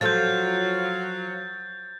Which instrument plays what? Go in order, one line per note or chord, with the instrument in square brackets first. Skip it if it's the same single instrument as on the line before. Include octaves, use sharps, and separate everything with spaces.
[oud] F3 F4 A4 [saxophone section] F#3 [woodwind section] C5 F5 [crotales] G6 A6